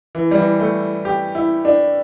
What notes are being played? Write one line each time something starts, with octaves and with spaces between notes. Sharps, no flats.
E3
G3
E3
A3
G4
E4
D4